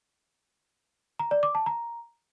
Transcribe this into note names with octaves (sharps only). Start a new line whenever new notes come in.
A#5
D5
D6
A5
A#5